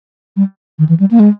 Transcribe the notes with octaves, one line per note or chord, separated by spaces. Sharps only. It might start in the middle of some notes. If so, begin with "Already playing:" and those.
G3
D#3
E3
G3
A#3
G#3